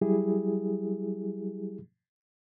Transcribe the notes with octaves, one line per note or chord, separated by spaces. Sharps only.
F#3 G3 E4 G4 G#4